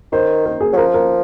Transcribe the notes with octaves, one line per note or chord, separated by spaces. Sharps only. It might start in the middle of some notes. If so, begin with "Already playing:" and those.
D#3 C5
A#4
G#4
F#3
F3 A#4
A#4